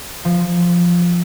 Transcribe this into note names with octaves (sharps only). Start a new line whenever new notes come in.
F3